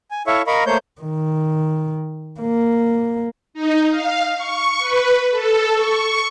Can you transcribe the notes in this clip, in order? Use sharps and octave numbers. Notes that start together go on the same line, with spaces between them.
G#5
E4 A4 C#5 E5 F5 C#6
A#4 D#5 F5 A#5 B5 C#6
A3 A#3 C5 C#5 G6
D#3
A#3
D#4
F5
C#6
B4
A4
C#6